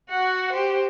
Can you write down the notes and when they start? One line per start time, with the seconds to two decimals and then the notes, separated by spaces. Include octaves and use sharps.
0.10 F#4 F#5
0.53 G4 C5